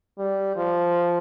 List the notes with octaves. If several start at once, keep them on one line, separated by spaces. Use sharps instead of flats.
G3
F3